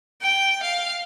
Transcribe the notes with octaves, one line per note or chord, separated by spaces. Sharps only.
G5
F5